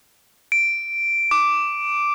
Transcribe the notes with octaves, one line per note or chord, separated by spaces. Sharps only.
D7
D6